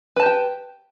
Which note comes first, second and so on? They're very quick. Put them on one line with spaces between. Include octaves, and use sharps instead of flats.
B4 A5 G4 G5